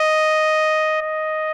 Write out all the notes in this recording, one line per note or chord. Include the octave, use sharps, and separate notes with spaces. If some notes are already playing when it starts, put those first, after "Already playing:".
Already playing: D#5
D#5